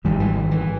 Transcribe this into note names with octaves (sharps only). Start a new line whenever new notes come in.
G#1 G#2 D#3 G3
E3
D#3
E3